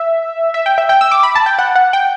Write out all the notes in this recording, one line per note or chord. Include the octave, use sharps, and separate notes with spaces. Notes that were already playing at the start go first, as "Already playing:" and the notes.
Already playing: E5
E5
G5
E5
G5
E6
D6
B5
A5
G5
F#5
F#5
G5